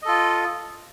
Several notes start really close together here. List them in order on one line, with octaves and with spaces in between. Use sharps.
D#5 A4 F4